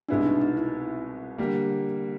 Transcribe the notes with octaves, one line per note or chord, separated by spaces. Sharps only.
C2 B2 G#3 B3 D4 E4
D#4
D#4
E4
D3 G3 A#3